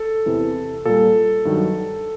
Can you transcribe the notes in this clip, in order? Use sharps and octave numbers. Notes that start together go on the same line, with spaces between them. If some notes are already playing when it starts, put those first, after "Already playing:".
Already playing: A4
E2 C3 E3
A#2 G3 A4
G2 D#3 F#3